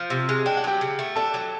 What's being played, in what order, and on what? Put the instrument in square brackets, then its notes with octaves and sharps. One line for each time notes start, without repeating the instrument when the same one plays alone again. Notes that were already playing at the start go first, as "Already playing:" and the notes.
Already playing: [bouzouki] F3
C3
G#3
[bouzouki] D4 [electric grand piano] G5
[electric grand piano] F#5
[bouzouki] F#3 [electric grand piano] G4 G5
[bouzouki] C#3
A3
[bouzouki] D4 [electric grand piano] A4 A5
[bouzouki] F#3